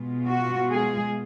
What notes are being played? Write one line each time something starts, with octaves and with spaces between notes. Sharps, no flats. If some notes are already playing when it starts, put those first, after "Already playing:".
Already playing: B2 G#3 B3 F4
F#4
G#3 G#4